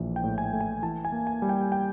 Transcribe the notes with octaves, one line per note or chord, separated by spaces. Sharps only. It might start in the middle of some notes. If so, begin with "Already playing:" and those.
Already playing: A#1 E3
G5
A2
G#5
A3
G#5
E3 A5
G#5
A#3
G#5
G3
G5
G5